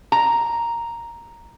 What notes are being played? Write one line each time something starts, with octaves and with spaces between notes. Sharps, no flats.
A#5